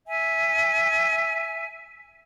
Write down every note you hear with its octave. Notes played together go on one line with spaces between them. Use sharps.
E5 G#5